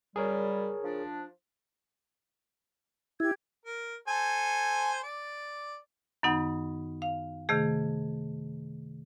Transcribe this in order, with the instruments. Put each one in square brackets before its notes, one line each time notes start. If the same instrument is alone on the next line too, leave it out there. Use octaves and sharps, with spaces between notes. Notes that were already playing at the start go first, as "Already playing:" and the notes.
[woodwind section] F#2 G3 [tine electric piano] G#4 A#4 C#5
[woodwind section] F3 D4
[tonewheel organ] E4 [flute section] G4 G#6
[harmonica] A#4
A4 C5 G#5
D5
[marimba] F#2 D#3 B3 D#4 F#5
F5
C3 D#3 A3 G#4